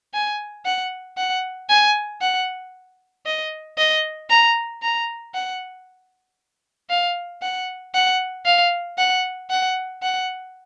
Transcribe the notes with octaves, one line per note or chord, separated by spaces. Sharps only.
G#5
F#5
F#5
G#5
F#5
D#5
D#5
A#5
A#5
F#5
F5
F#5
F#5
F5
F#5
F#5
F#5